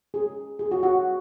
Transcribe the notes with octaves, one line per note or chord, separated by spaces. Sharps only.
G#4
G#4
F#4
F#4